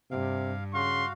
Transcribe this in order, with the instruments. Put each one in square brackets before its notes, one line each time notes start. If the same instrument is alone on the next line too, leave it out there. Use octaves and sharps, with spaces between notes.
[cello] G2 [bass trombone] C3 [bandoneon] F5
[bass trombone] C#3 [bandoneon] F#4 F5 [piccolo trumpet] C6